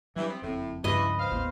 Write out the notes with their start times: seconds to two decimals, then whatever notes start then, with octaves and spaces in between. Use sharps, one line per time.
0.16 G2 E3 F#3 G3
0.29 B3 C4
0.42 F#1 F2 A2 C4
0.84 C#2 G2 C#3 E3 F3 B4 D#5
1.19 C5 F5
1.32 A1 D#2 G3 B3